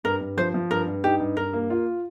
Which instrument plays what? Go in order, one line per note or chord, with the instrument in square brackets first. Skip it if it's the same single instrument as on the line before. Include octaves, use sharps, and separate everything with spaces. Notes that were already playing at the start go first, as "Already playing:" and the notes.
[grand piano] G2 [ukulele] A#4
[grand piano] G2
[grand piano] F3 [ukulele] C5
[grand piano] F3
[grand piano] G2 [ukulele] A#4
[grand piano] G2
[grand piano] D#4 [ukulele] G4
[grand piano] G2
[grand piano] G2 [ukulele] A#4
[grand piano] A#3
F4